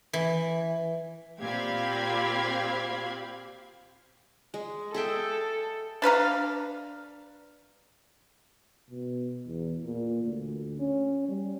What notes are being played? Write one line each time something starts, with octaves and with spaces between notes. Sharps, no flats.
E3
A#2 C4 G4 F5 B5 G#6
G#3
G#4 A4 E5 G5
D4 B4 F5 A#5
B2
E2
A#2
D2
C#4
G3